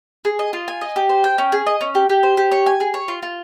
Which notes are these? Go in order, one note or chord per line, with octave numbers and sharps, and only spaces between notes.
G#4
D#5
F4
G#5
D#5
G4
C5
G5
C#4
G#4
D#5
C#4
G4
G4
C5
G4
C#5
G#5
G#4
C#5
F4
F4